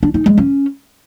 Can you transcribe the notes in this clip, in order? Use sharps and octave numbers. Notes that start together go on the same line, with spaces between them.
D4
D#4
G#3
C#4